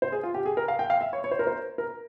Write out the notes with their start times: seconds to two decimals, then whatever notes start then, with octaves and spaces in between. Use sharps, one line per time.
0.02 C5
0.12 G#4
0.23 F4
0.34 G4
0.46 G#4
0.57 A#4
0.68 F5
0.79 G5
0.90 F5
1.01 E5
1.13 C#5
1.24 C#5
1.31 C5
1.39 A#4
1.47 C5
1.78 A#4